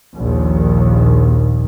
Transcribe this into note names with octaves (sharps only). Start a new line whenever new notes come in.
A#1 D#2